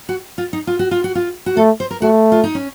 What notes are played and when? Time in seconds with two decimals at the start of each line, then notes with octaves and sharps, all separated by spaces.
0.09 F#4
0.38 F4
0.53 D#4
0.67 F4
0.79 F#4
0.91 F4
1.04 F#4
1.15 F4
1.46 F#4
1.57 A3 A4
1.80 C5
1.91 A#4
2.02 A3 F#4
2.32 F4
2.44 D#4
2.55 C#4